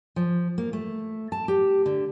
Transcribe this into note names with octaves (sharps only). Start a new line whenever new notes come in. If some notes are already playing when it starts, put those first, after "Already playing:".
F3
A#3
A3
A5
G4
D3